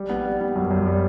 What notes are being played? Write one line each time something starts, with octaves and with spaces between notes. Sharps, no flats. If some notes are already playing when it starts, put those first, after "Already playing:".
Already playing: G3
B3
G3
B3
F#2
F#2
G3